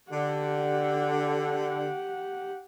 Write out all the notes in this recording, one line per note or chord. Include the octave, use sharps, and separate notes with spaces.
D3 G4 F#5